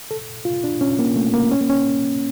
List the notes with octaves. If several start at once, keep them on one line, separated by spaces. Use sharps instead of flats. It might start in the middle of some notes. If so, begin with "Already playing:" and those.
A4
F4
D4
C#4
A#3
A3
A#3
C#4
A#3
C#4